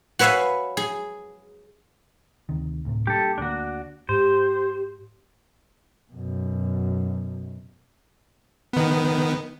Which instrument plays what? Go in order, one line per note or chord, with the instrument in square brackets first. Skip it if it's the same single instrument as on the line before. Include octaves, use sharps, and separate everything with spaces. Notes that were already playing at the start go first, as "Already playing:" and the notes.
[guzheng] F#4 B4 C#5 E5 F5 G#5
G#4
[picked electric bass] D2 C3 D#3
D2 A2 C3
[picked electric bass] G3 A#3 D4 [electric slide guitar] G4 A4
[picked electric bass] D2 D3 A#3 [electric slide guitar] D4 F#4
[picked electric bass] G#2 [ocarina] G4 [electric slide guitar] C5
[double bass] F#2 B2
[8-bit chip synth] D#3 B3